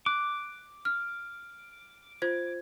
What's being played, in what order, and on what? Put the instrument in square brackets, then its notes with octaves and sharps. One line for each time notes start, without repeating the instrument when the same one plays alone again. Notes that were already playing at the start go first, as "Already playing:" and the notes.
[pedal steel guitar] D6 [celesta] F#6
[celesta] F6
F4 C5 G#6